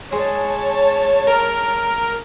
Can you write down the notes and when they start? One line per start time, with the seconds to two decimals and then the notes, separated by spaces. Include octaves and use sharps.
0.12 G#3 C#5 A5
1.27 A#4